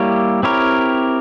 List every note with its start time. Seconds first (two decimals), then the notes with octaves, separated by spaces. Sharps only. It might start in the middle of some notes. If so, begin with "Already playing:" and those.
Already playing: G3 A#3 E4 G4 C#5
0.43 C4 E4 G4 A#4 C#5